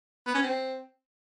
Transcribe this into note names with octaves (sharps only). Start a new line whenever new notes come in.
B3
C#4
C4